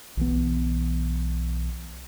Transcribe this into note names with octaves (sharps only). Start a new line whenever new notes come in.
B1 E3 B3